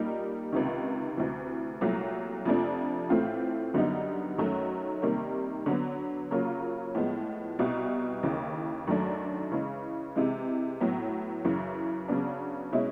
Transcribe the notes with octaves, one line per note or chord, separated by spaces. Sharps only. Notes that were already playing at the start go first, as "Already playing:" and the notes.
Already playing: A#2 G3 A#3 D#4
C#2 C3 D#3
D2 C3 E3
C2 A#2 F#3 A3
F2 C3 F3 A3 D4
A2 E3 A3 C4 F4
F#2 D3 G3 B3 D#4
F#2 D#3 F#3 A3 C#4
C3 D#3 G3 A#3
D3 F#3 B3
C#3 F#3 A#3 C#4 F4
A2 F3 G#3 B3
C2 B2 G3 B3
D#2 C#3 E3
F#2 D#3 F#3 A3 D4
C#3 E3 G#3
C3 E3 G#3
A2 F#3 B3
F#2 C#3 E3
C#3 F#3 B3 D4
B2 G#3 C#4 E4